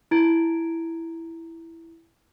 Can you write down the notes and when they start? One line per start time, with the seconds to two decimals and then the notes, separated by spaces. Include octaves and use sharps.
0.11 E4 A#5 G#6 A6 D7